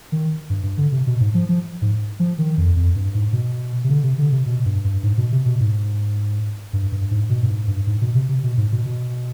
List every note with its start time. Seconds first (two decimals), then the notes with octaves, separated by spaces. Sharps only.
0.12 D#3
0.50 G2
0.63 G2
0.78 D3
0.92 C3
1.07 B2
1.20 G#2
1.34 F3
1.49 F3
1.82 G#2
2.20 F3
2.38 D#3
2.58 F2
2.76 F2
2.95 G2
3.15 G#2
3.33 B2
3.84 C3
3.90 D3
4.04 C3
4.18 D3
4.32 C3
4.46 B2
4.65 G2
4.84 G2
5.03 G#2
5.18 B2
5.32 C3
5.46 B2
5.60 G#2
6.73 G2
6.92 G2
7.11 G#2
7.30 B2
7.43 G2
7.49 G#2
7.68 G2
7.87 G#2
8.01 B2
8.15 C3
8.29 C3
8.44 B2
8.57 G#2
8.72 B2
8.86 B2